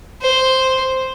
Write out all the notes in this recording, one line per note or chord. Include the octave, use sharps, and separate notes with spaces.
C5